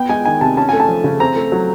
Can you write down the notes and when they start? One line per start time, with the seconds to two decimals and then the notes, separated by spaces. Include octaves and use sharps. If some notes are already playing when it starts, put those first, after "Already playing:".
Already playing: B3 G5
0.09 G#3 G#5
0.25 D#3 G#5
0.41 C3 A5
0.57 C#4 A5
0.69 A3 G#5
0.80 A5
0.89 F3
1.04 C#3
1.20 C4 A#5
1.36 A3
1.52 F#3